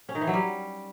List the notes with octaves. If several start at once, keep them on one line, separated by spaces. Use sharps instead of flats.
C#4
D#3
E3
F#3
G3